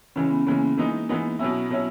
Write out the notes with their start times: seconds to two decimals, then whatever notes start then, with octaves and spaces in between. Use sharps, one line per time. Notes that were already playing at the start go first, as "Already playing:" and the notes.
0.16 C#3 E3 G#3 C#4
0.31 B3
0.47 C#3 E3 G#3 A#3
0.77 E3 G#3 B3 D#4
1.09 E3 G#3 B3 D#4
1.39 B2 F#3 B3 C#4 E4
1.70 B2 F#3 C#4 E4